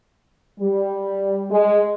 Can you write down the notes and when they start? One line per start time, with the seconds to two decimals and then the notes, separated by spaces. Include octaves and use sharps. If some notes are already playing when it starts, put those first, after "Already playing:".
0.60 G3
1.50 G#3